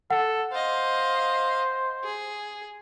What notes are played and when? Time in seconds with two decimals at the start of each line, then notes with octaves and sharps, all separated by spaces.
0.11 A4 F#5
0.52 C5 D#5 F5
2.04 G#4